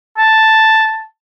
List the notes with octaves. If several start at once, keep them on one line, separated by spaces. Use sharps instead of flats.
A5